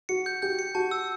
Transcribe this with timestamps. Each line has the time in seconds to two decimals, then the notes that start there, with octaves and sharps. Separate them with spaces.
0.09 F#4 C#7
0.26 G6
0.42 G4 G6
0.59 C#7
0.75 F#4 A5
0.91 E6